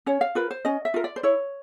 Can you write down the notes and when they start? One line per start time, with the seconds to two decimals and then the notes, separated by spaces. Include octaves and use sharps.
0.06 C#4 C#5
0.21 F5
0.35 F4 A#4 B4
0.51 C5
0.65 C#4 D#5
0.85 E5
0.94 F4 A#4
1.04 D5
1.16 C5
1.23 E4 C#5